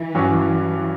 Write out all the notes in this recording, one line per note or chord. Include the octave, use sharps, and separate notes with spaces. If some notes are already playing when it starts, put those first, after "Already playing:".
Already playing: E3
G2 F#3 C#4